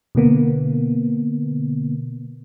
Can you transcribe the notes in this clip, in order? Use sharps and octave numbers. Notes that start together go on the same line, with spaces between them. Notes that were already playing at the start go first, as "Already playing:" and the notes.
B2 D3 A#3 B3